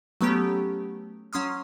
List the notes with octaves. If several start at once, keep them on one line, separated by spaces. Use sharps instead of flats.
F#3 A3 B3 C#4 G4
F#3 C#4 C6 D#6 F6